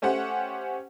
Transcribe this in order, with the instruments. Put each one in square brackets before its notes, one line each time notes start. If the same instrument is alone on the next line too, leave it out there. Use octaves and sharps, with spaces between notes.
[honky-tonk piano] A3 C#4 G4 C5 F#5